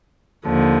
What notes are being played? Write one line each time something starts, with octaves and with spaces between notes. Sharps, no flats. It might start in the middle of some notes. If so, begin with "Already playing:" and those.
D#2 D3 F3